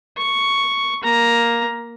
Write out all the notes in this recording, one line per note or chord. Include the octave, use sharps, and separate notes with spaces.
C#6
A#3 A#5